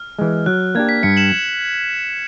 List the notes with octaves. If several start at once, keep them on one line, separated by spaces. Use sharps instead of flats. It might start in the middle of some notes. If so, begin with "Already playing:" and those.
Already playing: F6
E3 G#3
F#3 F#6
F6
F#6
A#3 D4 G4 G#6
B6
G2 B6 C#7
E7 F#7